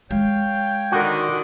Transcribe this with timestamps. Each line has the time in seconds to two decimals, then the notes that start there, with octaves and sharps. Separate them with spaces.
0.11 G#3 C#5 F5 G5
0.92 D3 D#3 F#4